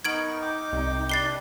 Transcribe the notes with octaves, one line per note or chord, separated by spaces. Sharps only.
B3 D#4 A#4 C#6 G#6 D7 F#7
G5 D6
C2
D4 G4 B4 A6 C7 G7